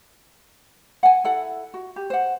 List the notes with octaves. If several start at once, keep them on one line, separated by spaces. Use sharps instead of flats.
F#5 G#5
E4 A4 F#5
F#4
G4
C5 F#5